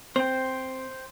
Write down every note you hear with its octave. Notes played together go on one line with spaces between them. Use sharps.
C4 C5 G5